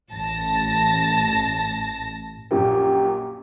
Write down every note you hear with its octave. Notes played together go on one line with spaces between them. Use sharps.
A1 A5 A#6
A#1 F#2 A#2 G4